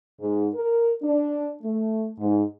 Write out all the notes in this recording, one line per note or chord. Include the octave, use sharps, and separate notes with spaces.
G#2
A#4
D4
A3
G#2